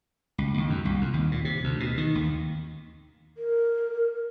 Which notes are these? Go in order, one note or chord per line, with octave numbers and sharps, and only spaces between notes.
C#2
D#2
F#2
C2
F2
D#2
A#2
C3
D2
B2
D#3
D#2
A#4